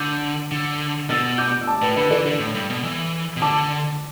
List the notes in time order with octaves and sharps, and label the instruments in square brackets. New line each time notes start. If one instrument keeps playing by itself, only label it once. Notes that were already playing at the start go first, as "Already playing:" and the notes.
Already playing: [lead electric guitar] D3 [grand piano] D6 G6
[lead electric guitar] D3
[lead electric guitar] B2 [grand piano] E6 A6
[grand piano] D6 G6
E6
A5 D6
[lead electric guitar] A2 [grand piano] B4
[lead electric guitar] D3 [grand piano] B4
[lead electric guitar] E3 [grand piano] A4 D5
[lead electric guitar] D3
A2
G2
B2
E3
B2
[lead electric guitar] D3 [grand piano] A5 D6